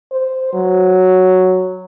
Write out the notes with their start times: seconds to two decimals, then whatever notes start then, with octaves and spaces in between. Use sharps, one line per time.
0.11 C5
0.53 F#3